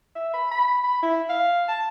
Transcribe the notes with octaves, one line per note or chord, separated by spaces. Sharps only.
E5
B5
B5
B5
E4
F5
A5